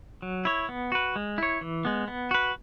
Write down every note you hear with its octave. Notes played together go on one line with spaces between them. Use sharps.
F#3
E4 C#5
B3
F#4 B4
G#3
E4 C#5
E3
G#3 B3
B3
F#4 B4